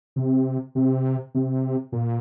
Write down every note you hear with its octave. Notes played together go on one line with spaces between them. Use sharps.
C3
C3
C3
A#2